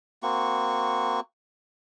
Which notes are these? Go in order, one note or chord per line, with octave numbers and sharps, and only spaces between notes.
A#3 C4 F#4 C#6